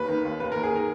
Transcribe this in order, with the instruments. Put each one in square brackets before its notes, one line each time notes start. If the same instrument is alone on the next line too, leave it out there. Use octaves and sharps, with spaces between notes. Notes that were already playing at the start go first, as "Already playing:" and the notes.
Already playing: [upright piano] D#2 B4
D#3
D#2
D#2 B4
A#4
D#2
G#4
D#3 A#4